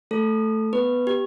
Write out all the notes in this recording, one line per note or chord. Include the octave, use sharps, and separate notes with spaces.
A3 A4
B3 B4
G4